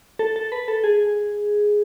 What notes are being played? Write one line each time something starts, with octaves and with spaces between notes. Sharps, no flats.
A4
A4
B4
A4
G#4